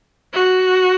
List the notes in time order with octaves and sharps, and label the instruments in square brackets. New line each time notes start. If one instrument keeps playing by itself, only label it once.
[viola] F#4